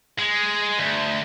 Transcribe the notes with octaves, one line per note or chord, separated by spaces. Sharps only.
G#3
D2